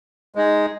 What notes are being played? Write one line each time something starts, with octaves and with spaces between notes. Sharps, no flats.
G#3 D#4 G#4